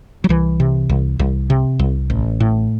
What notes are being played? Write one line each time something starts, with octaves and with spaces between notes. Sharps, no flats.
F#3
C2 E3
C3
C2
C2
C3
C2
A1
A2